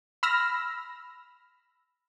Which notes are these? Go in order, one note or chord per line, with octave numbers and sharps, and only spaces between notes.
B5 E6 F6 A#6